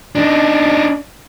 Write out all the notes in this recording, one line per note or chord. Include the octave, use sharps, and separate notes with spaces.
D4 D#4